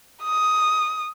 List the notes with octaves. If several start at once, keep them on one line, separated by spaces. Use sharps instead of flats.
D#6